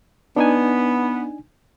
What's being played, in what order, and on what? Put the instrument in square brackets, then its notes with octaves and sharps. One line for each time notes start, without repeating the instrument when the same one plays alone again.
[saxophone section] B3 [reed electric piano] D4 D#4 G#5